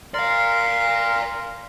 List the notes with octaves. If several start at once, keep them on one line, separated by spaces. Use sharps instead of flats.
A#4 D5 F5 C6